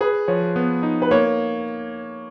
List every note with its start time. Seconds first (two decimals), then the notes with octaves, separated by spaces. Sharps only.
0.01 G#4 B4
0.28 F3 C#5
0.56 B3
0.83 D#4
1.02 B4
1.11 A#3 C#5